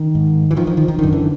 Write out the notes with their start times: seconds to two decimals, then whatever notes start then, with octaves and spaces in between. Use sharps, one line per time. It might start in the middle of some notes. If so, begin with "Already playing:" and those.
Already playing: D#3
0.15 G#2
0.51 E3
0.56 D#3 F3
0.67 D#3 F3
0.77 D#3 F3
0.88 D#3
0.99 F#2 D3 D#3
1.13 D3 E3